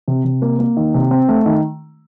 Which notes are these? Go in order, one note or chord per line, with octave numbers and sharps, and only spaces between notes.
C3
C3
A#3
A#3
D#3
C3
C4
A3
D#3